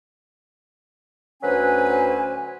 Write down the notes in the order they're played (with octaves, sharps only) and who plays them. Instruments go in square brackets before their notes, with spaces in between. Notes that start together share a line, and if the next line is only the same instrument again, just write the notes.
[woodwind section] D2 F#3 C#4 B4 C5 G#5